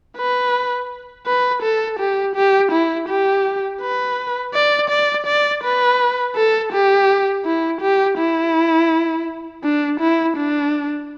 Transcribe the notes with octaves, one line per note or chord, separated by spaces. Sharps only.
B4
B4
A4
G4
G4
E4
G4
B4
D5
D5
D5
B4
A4
G4
E4
G4
E4
D4
E4
D4